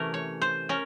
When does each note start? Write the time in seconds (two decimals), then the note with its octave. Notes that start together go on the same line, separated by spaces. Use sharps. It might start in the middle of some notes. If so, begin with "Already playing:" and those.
Already playing: C3 E3 A3 C#4 A#4
0.14 C#5
0.42 C5
0.69 C#4 A#4